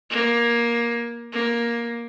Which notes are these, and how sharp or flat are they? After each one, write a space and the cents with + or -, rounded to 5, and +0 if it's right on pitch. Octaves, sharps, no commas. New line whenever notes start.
A#3 +15
A#3 +10